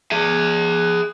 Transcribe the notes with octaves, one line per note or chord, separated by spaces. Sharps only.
G#4 E5